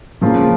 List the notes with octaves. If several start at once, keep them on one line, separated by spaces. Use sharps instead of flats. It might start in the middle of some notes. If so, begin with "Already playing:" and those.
C#3 F3 A#3 F4